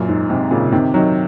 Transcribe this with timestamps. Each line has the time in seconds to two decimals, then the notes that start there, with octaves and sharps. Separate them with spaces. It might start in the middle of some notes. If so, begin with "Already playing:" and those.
Already playing: F#2 A#2
0.09 G#2
0.30 G#2 C3
0.51 A#2 C#3
0.72 C3 D#3
0.94 D#3 F#3